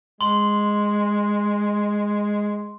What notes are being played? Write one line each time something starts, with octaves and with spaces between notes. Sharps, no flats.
G#3 C6 F#7